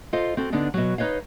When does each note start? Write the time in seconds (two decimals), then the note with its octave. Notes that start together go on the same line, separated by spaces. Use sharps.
0.13 F4 A4 C5 D#5 F5
0.37 C4 F#4 A4
0.52 D3 B3 D4 D#4
0.74 B2 F#3
0.98 D#4 B4 C#5 D#5 F5